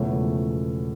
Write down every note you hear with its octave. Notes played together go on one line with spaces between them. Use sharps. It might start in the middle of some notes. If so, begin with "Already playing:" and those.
Already playing: E1 E2 C#3 F3 A3 C#4